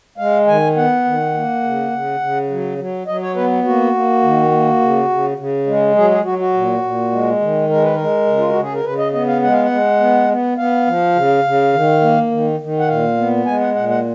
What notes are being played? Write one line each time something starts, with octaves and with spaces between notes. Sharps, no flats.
G#3 F5
D#3 G#5
B3 F#5
D#3
A#3
C#3
C#3
C#3
F#3
F#3
F#3 D#5
C#5
B3 B4
A#3 F#4
A#3
D#3
A#3
C#3
C#3
C#3
G#3
F#3 G#4
G#4
F#3 F#4
F#4
A#2
A#2
G#3
D#3
G#3 A#4
B4
G#3 A#4
C#3
F4
F#4
C#3
G#4
A#4
C#3 B4
D#5
B3 D#5
F5
G#3 F#5
F5
F#5
G#3
B3
B3
B3 F5
F3
C#3
C#3
D#3
A#3
D#3
D#3
F#5
A#2 F5
B3
G#3 G#5
F#5
A#2 F#5
F#5